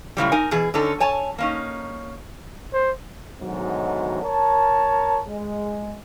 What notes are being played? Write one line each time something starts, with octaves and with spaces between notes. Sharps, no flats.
F#2 A2 C#3 G3
D#4 A#4 G#5
B2 E3 G#4
D3 C#4 D#4 A4
C#5 G#5 A5
A#3 C#4 D#4
C5
D2 G#2 B2 D#3 F#3
A#4 C#5 A5
G#3